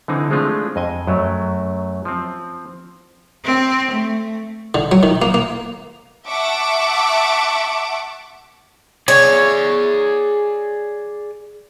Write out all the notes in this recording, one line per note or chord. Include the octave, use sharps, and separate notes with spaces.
D3 E3 C4 D#4
F3 G#3 A3 C4 D4 F4
F2 D#5 G#5
F#2 F#3 A3
F3 C4
C4
A3
D3
F#3
D#3
A#3
A#3
E5 F#5 A5 C#6 D6
G#4 C#5 D5